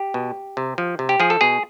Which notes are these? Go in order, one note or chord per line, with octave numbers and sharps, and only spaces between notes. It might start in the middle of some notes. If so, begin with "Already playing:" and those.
Already playing: G4
B2
C3
F3
C3
G4
F3 G#4
A4
B2 G#4